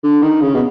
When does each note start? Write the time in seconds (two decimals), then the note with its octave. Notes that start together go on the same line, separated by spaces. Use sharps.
0.04 D3
0.22 D#3
0.41 C#3
0.55 B2